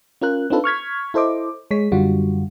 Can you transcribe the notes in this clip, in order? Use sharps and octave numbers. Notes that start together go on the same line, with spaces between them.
C#4 F4 A#4 F#6
C4 D4 D#4 F4 A4 B4
C#6 F6 G#6 B6
E4 A4 C5 D#5 D6
G#3 C#5 B6
F#2 D3 G3 F4 F#4